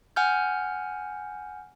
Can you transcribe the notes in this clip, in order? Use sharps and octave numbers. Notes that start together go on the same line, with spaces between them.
F#5 G#5 F6 G6